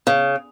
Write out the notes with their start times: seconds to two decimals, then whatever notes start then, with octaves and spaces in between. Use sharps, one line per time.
0.07 C#3